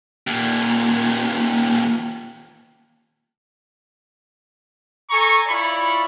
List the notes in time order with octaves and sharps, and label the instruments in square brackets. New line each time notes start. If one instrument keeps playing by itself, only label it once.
[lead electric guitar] D#2 A#2
[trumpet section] A4 G#5 A#5 C#6
E4 F4 C#5 D5 B5 C#6